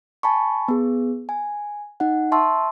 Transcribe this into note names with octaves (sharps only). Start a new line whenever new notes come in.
G#5 A5 B5 C#6
B3 G#4
G#5
D#4 F#5
E5 A5 C6 C#6 E6